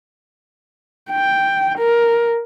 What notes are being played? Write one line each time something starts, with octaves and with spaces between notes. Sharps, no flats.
G5
A#4